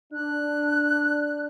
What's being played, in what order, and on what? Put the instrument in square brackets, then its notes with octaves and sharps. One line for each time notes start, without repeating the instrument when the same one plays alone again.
[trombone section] D4 [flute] F#6